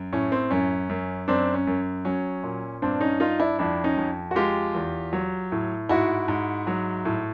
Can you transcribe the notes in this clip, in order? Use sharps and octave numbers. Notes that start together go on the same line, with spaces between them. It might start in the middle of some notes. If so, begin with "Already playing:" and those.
Already playing: F#2
A2 C#4
C4
F#2 C#4
F#2
F#2 C4 D4
C#4
F#2
F#3 C#4
A#2
G2 C4 D4
C#4 D#4
G2 D#4 F4
D4 E4
F2 D4 E4
C#4 D#4
F2
F#4
G#3 F4 G4
E2
F#3
A2
G#2 E4 F#4
G#2
F#3
A2